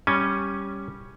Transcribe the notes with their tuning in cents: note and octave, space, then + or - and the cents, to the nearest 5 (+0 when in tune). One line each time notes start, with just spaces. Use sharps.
G3 +0 C#4 +0 G#5 +0